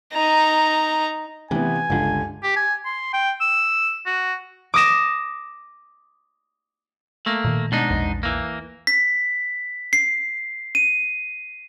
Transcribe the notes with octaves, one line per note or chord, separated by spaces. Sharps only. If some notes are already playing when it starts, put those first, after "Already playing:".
D#4 A#5
C3 E3 B3 G#5
G1 C#2 D3
G4
G#5
C6
G5
E6
F#4
D6 D#6 A#6 E7
A3 A#3
A#2 D#3
G#2 B2 D4 D#4
A#1 E2
E3 A#3
B6
C7
D#7